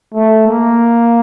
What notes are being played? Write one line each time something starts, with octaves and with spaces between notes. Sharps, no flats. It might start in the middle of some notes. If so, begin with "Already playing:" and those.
A3
A#3